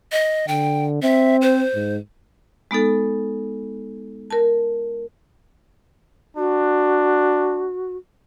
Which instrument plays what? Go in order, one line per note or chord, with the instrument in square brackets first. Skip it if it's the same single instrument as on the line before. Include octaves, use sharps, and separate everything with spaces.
[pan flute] D#5
[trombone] D3 [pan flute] G5
[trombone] C4 [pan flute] E5
[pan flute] C5
[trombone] G#2
[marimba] G#3 B3 D#4 A4
A#4 A5
[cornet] D4 [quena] F#4